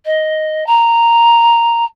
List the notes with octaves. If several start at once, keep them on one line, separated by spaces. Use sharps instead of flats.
D#5
A#5